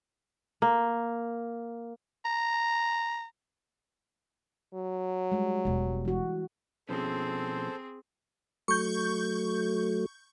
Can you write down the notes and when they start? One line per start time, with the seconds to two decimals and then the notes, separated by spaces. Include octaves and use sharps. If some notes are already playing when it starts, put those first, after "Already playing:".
0.62 A#3
2.25 A#5
4.74 F#3
5.32 G3 G#3
5.65 E1 B3
6.05 E3 F#4
6.89 B2 F3 C4 C#4 G#4 A4 C5
8.68 F#3 A3 C#6 G6